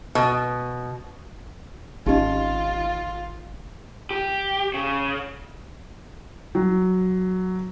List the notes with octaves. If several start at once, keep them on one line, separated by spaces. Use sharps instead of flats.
B2
G#1 C#4 D#4 F4 G4 D#5
G4
C#3
F#3